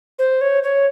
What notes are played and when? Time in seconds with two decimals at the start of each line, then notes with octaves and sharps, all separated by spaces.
0.19 C5
0.41 C#5
0.63 C#5